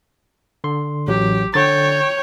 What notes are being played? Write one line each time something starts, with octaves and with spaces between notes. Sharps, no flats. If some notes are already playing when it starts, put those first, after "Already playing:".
D3 C6
A1 F#3 G4
D3 C#5 G5 A6